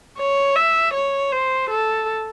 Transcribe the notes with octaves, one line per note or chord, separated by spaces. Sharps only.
C#5
E5
C#5
C5
A4